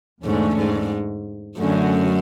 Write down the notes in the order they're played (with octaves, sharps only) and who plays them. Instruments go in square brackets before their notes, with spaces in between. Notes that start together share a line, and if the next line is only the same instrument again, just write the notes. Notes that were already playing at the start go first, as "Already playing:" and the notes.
[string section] E2 D3 A3 C#4 [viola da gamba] G#2
[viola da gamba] G#2
[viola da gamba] F#2 [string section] D3 A3 C#4 F#4